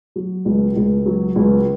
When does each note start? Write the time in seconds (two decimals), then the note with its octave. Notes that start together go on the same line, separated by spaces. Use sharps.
0.16 F#3
0.45 C#2
0.76 C#2
1.06 F#3
1.36 C#2